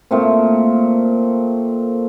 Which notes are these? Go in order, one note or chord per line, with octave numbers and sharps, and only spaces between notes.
A#2 A3 C4